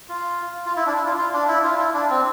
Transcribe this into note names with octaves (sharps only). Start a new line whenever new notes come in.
F4
F4
E4
D4
E4
F4
F4
D4
E4
F4
E4
D4
C4